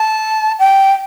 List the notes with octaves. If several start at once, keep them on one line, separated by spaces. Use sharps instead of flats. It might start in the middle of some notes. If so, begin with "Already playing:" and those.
Already playing: A5
G5